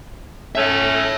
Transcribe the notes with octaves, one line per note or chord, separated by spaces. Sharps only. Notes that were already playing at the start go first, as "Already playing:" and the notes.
A3 C#4 C#5 E5